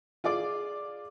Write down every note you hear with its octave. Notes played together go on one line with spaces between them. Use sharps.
F4 G#4 D5 D6